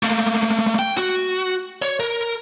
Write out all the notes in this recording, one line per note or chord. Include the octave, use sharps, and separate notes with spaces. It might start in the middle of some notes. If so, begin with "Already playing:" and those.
A3 A#3
G5
F#4
C#5
A#4